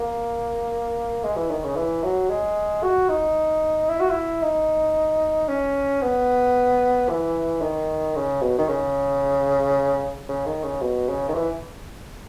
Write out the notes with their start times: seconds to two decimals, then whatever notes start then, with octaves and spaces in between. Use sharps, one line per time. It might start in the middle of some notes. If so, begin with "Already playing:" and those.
Already playing: A#3
1.24 G#3
1.36 E3
1.50 D#3
1.64 C#3
1.77 E3
2.04 F#3
2.29 G#3
2.83 F#4
3.09 D#4
3.90 E4
4.00 F#4
4.09 E4
4.43 D#4
5.49 C#4
6.02 B3
7.09 E3
7.61 D#3
8.16 C#3
8.42 B2
8.58 D#3
8.69 C#3
10.29 C#3
10.46 D#3
10.63 C#3
10.81 B2
11.08 C#3
11.28 D#3
11.35 E3